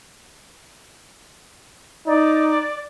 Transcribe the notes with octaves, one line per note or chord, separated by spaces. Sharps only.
D#4 D5